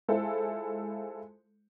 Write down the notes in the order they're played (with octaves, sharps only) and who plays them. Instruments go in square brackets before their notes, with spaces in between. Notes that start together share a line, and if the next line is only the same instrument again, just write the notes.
[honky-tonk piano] G#3 E4 F4 A4 C5